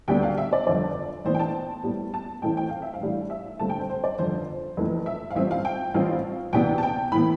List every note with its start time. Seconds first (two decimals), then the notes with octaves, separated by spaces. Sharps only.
0.08 D2 D3 G3 B3 D4 G5
0.23 F5
0.38 E5
0.53 D5
0.67 G1 F2 D3 D5
1.25 A1 A2 E3 B3 D4 C5
1.35 G5
1.39 A5
1.84 A2 G3 B3
2.14 A5
2.42 A1 A2 E3 A3 C4 G5
2.57 G5
2.69 F5
2.82 E5
2.94 F5
3.01 A1 A2 G3 D4
3.30 E5
3.59 G2 D3 A3 C4 A5
3.69 G5
3.79 C5
3.90 C5
4.04 D5
4.18 G1 F2 D3 C5
4.77 F1 F2 E3 A3
5.06 E5
5.31 F5
5.35 A1 G2 F3 C4 E5
5.51 F5
5.65 G5
5.94 A1 G2 F3 C4 F5
6.53 D2 C3 E3 B3 D4 G5
6.78 A5
6.83 G5
7.12 A2 E3 B3 B5